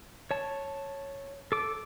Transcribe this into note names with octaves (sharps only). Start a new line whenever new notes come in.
C#5 A5
A4 D6